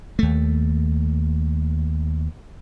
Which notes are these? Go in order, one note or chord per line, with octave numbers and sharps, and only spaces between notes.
D#2 A3